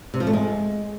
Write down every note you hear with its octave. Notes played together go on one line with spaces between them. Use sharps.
C3
F3
A3
G#3